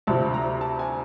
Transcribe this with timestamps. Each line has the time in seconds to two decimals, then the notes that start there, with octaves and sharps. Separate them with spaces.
0.07 D2 C3 F3 A5
0.34 A#5
0.61 A5
0.79 G#5